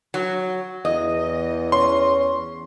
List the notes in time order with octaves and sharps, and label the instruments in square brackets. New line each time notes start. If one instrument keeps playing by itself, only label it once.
[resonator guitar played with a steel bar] F#3
[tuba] E2 [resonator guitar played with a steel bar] D#5
[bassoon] C#4 [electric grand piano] C6